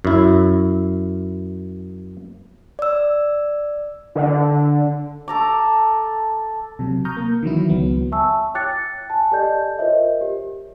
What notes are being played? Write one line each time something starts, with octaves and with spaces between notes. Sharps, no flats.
F#2 E4
D5 E6
D3
A4 A#5 D6
C3 F#3
A#5 C#6 D#6 F6 G6
A#3
D#3 E3 F#3 E4
C#2 F#3 B3
E5 G#5 A5 C#6 E6
C#5 G5 D6 F#6 A6 C#7
G#5 A5
G4 A4 D5 D#5 A5 G6
F4 A#4 C5 C#5 D#5 E5
G4